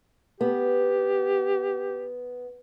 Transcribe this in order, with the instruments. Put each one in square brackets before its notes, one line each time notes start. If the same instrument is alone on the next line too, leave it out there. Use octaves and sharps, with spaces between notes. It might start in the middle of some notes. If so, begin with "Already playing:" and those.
[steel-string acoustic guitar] B3 [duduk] G4